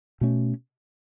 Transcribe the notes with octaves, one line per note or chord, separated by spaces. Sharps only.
B2 A3 C#4